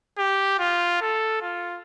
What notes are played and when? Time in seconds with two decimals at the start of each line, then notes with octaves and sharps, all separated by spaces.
0.18 G4
0.59 F4
1.01 A4
1.42 F4